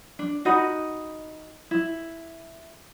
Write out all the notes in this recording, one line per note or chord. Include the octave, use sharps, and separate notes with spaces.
D4
D#4 F#4 D#5 B5
E4